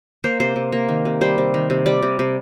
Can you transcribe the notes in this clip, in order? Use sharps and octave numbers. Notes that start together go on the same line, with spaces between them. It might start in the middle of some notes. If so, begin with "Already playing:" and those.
A#3 C5
C3 C5
C3
A#3
D#3
C3
G3 C5
C3
D#3
C3
G3 D5
C3
C3